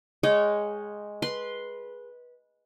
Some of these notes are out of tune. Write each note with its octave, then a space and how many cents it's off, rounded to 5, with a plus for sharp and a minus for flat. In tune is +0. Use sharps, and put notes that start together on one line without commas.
G#3 +0 C#5 +0 G5 -35
B4 -15 C6 +0